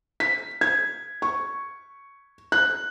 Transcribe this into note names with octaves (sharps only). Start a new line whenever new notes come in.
B6
G#6
C#6
F#6